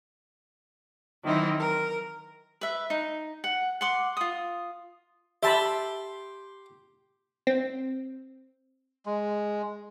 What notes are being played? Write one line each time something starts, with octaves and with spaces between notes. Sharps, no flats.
D#3 E3 F#3 C4 D#4 E4
A#4
B4 E5
D#4
F#5
F#5 C6 D6
F4 D#6
G4 E5 A5 B5 C6
C4
G#3